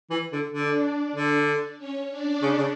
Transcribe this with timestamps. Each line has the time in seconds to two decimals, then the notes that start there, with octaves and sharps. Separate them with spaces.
0.11 E3
0.32 D3
0.53 D3 D4 D5
1.15 D3
1.78 C#4 C#5
2.10 D4 D5
2.42 C#3
2.58 C#3